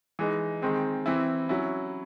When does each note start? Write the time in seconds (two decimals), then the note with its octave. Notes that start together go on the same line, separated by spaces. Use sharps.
0.19 E3 G#3 D#4
0.62 D#3 G#3 C4
1.06 E3 C4 E4
1.49 F#3 C#4 E4